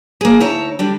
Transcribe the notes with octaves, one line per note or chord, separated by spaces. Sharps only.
A#3 G#4
D2 D#4 E4 C#5 A5 A#5
D3 G3 D4